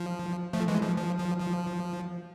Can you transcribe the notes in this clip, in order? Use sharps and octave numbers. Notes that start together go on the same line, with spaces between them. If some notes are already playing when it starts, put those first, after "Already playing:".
Already playing: F3
F3 A3
E3 G#3
F3
F3
F3
F3